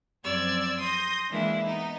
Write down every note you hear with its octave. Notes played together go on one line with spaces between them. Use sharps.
F#2 F3 C4 D5 E6 G#6
C6 D#6 G6 A#6
E3 G#3 A#3 D4 E4
B3 D#4